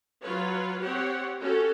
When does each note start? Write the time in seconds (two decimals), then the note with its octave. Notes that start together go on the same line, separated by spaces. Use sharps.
0.22 F#3 F4 B4 C#5
0.81 C4 G4 C#5 F#5
1.39 C#4 F#4 G4 A4